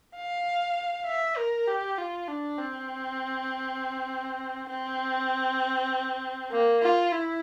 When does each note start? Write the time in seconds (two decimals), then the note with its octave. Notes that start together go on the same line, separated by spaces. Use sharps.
0.16 F5
1.06 E5
1.37 A#4
1.67 G4
1.98 F4
2.28 D4
2.58 C4
4.70 C4
6.52 A#3
6.82 F4
7.12 E4